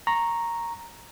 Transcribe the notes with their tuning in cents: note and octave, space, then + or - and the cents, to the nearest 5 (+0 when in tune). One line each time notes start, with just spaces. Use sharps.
A#5 +0 C#6 -15